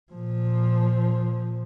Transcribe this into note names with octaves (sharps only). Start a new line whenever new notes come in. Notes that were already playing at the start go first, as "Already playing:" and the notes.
A#2 F3